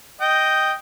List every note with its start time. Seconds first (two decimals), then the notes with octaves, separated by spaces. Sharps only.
0.21 D#5 G5